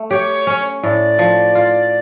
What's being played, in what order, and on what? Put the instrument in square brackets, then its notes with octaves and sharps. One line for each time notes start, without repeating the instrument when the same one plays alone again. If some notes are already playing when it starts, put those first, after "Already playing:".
Already playing: [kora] A3
[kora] G4 [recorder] C#5
[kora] C#4
[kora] A2 [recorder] D5
[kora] F3
F4